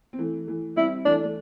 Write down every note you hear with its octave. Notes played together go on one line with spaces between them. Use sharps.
C4
E3 A3
E3 A3
G3 C4 E4
E3 A3 D4
A3